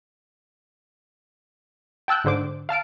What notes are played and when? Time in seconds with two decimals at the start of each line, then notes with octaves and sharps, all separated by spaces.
2.08 G5 A5 E6 F#6 G6
2.24 G#2 D3 C5 D6
2.69 F5 A5 F6 D7